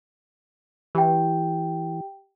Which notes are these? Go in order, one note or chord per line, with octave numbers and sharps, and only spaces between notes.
E3 G4 G5